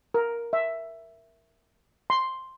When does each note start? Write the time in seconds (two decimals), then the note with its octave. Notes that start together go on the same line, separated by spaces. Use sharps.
0.14 A#4
0.53 E5
2.10 C6